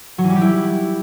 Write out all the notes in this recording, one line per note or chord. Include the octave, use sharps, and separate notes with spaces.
F#3
E3
G3
G4
E4